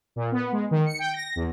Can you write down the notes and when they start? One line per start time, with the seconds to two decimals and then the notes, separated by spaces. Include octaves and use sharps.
0.16 A#2
0.32 B3
0.52 G#3
0.71 D#3
0.86 C#7
0.99 G5
1.14 A#6
1.36 E2